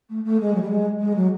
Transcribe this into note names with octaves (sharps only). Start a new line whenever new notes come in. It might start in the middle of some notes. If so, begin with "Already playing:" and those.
A3
A3
G#3
F#3
G3
G#3
G#3
F#3